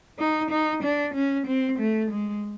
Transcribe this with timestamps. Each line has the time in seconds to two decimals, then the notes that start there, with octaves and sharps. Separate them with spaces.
0.19 D#4
0.51 D#4
0.83 D4
1.14 C#4
1.47 C4
1.79 A3
2.11 G#3